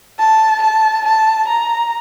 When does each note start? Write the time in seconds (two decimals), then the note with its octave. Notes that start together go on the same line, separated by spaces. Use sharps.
0.19 A5
0.62 A5
1.05 A5
1.48 A#5